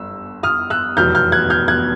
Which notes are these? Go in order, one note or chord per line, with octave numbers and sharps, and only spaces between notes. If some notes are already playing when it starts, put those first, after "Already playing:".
Already playing: G1 E6
D#6 F6
E6 F#6
F1 E2 B2 F#3 F6 G6
F6 G6
F#6 G#6
F6 G6
F#6 G#6